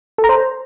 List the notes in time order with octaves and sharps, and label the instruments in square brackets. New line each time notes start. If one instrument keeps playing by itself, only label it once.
[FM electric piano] A4
A#5
C5